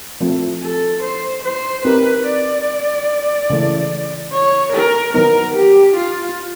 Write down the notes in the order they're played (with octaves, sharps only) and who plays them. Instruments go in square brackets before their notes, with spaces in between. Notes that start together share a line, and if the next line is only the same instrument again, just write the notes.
[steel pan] F3 A3 C4
[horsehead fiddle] A4
C5
C5
[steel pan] C4 D#4 G4 A#4 [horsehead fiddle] B4
[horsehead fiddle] D5
[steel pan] C#3 E3 A3
[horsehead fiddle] C#5
A#4
[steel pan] D#3 F#3 B3 D#4 [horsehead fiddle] A#4
[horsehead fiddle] G4
F4